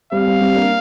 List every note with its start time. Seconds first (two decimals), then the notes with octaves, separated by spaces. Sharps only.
0.12 G3 C4 F5
0.27 G3 C4
0.41 G3 C4
0.55 A#3 D4